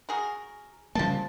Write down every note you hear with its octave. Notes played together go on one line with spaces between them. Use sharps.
F#4 G#4 A#4
C#3 F3 G3 A#3 A5